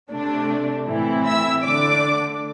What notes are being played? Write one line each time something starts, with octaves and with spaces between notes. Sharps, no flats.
C3 A3 D4
A2 E3 C4 E4
E5 E6
D3 A3 D4 D5 D6